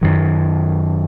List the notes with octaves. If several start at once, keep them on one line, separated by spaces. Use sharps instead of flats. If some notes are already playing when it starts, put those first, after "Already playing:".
F#2 D#3 F#3